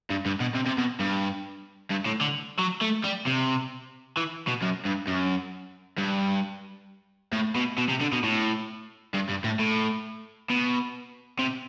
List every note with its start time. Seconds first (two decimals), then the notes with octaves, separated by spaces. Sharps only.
0.10 G2
0.26 G2
0.40 B2
0.55 C3
0.66 C3
0.78 B2
1.00 G2
1.90 G2
2.05 A2
2.21 D3
2.59 F#3
2.81 A3
3.04 G3
3.26 C3
4.17 E3
4.47 B2
4.62 F#2
4.85 G2
5.07 F#2
5.98 G2
7.33 A2
7.56 B2
7.78 B2
7.89 C3
8.01 D3
8.13 B2
8.24 A2
9.14 G2
9.29 G2
9.44 A2
9.59 A2
10.50 B2
11.39 C3